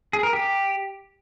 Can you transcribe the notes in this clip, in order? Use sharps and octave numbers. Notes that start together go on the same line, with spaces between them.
G#4
A#4
G4